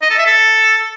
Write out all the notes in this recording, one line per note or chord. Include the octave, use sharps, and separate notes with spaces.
D#5
A4
E5
A4